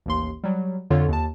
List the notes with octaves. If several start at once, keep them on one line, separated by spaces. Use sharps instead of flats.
A1 D#2 C6
F#3 G3
F2 D3 F4 C#5
D#2 A5